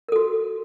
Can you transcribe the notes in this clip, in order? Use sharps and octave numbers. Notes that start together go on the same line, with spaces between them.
F#4 A4 A#4